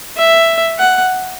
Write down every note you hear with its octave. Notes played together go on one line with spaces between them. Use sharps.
E5
F#5